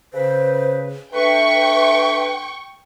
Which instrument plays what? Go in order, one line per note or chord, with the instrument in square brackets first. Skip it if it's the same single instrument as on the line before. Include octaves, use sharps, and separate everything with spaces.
[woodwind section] C#3 B4 [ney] C5
[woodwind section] A3 D4 B4 [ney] E5 [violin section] G5 C#6